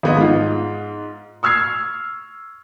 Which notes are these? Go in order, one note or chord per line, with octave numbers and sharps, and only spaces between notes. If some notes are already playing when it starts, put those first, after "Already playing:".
G#1 B3 D#5
G#2 F4
C#6 E6 F6 G#6 C7